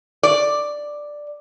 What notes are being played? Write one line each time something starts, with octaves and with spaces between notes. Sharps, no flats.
D5